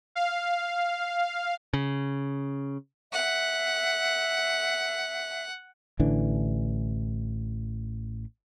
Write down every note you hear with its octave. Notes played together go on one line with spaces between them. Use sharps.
F5
C#3
E5 F#5
A1 D3 E3 D4